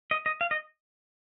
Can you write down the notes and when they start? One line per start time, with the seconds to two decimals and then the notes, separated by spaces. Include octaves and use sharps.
0.11 D#5
0.26 D#5
0.41 F5
0.51 D#5